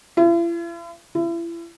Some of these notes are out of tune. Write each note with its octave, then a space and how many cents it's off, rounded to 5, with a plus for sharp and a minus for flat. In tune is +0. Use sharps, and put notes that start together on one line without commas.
E4 +45
E4 +35